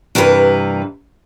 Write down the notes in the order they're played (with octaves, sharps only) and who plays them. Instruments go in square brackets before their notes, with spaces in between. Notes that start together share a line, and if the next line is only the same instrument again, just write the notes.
[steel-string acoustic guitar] G2 C3 E3 A#4 B4